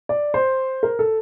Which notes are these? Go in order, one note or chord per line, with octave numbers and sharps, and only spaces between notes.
D5
C5
A#4
A4